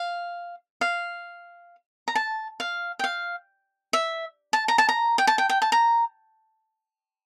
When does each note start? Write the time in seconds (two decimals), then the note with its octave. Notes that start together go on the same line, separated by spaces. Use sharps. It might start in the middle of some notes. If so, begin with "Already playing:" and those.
Already playing: F5
0.81 F5
2.08 A#5
2.15 A5
2.60 F5
2.99 G5
3.04 F5
3.93 E5
4.53 A5
4.68 A#5
4.78 A5
4.89 A#5
5.18 G5
5.27 A5
5.38 G5
5.49 G5
5.62 A5
5.72 A#5